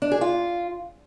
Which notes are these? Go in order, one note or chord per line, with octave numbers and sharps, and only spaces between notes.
D4
G#4
F4